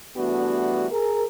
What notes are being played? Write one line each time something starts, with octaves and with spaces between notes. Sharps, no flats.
E3 G3 A3 B3 D4 F#4
G#4 A#4